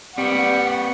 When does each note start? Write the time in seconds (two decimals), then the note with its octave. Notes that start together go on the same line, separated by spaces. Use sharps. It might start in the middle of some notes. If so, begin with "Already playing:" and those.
0.18 G3 C4 B4 F#5 C#6